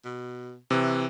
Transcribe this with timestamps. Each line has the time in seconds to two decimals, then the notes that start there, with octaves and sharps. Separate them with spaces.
0.04 B2
0.71 C3 E3